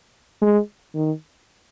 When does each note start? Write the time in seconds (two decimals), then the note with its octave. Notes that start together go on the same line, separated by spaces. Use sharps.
0.42 G#3
0.95 D#3